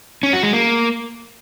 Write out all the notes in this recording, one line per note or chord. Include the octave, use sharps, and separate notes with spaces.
C#4
F#4
G#3
A#3